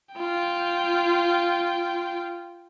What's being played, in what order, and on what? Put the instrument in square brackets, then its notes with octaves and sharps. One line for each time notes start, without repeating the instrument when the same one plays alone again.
[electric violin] F4 G5